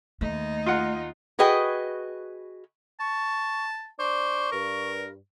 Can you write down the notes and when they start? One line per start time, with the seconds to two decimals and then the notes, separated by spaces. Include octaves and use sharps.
0.21 D#2 A3 D#4
0.66 F4 F#5
1.39 F#4 G#4 B4 D#5 G5
3.00 A5 C#6
3.99 D4 C5 C#6 D6
4.52 G2 A#4